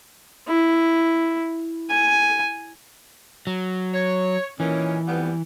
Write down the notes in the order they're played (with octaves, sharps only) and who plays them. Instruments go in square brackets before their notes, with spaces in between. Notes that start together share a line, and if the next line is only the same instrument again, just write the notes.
[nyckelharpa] E4
G#5
[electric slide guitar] F#3
[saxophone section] C#5
[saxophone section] A#2 D#3 C#4 [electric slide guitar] E3
[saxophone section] F2 G3 B3